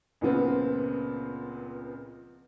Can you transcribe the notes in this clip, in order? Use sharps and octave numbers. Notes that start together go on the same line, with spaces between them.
C#2 A#2 C#3 F3 B3 C4